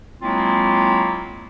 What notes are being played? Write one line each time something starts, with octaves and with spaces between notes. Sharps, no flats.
F#3 G#3 A#3 C4 E4 F4